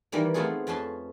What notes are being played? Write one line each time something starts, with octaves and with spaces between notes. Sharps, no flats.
D#3 E3 G3 A#3
A3 B3 C4 F4 F#4 G#4
F2 C#4 B4 A5 C6